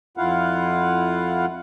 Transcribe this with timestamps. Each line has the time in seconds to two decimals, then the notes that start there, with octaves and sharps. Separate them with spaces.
0.17 F2 E4 F4 F5 F#5